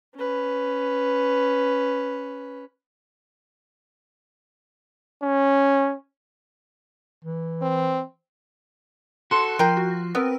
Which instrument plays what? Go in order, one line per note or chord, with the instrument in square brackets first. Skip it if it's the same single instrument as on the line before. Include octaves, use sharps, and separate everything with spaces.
[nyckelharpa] C#4 B4
[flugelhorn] C#4
[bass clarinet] E3
[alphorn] C4
[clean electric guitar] F#4 A4 [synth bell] C6 F#6
[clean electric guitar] F3 [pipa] A#4 G5
[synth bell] F#4
[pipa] B3 [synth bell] C4 A#4 B4